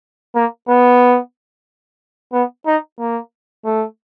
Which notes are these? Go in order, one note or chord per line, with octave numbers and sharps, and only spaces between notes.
A#3
B3
B3
D#4
A#3
A3